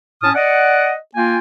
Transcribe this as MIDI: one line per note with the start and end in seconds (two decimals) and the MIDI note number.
0.22 0.30 45
0.22 0.30 61
0.22 0.30 81
0.22 0.30 87
0.22 0.30 89
0.35 0.94 74
0.35 0.94 75
0.35 0.94 78
1.15 1.39 58
1.15 1.39 65
1.15 1.39 79
1.15 1.39 80